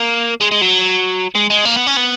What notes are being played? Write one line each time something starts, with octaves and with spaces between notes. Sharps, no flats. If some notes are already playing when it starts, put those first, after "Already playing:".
Already playing: A#3
G#3
G#3
F#3
G#3
G#3
A#3
B3
C#4
B3